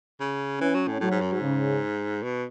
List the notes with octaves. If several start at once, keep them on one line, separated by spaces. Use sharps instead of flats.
C#3
E3 C#4
F#3
A2
A2 F#3
G#2
F#2
G#2
C#3
B2